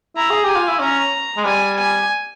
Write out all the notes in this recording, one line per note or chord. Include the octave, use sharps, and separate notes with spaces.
E4 A#5
G#4
G4 G#5
F4
E4
C#4 A#5
G#3
G3 G#5
G#5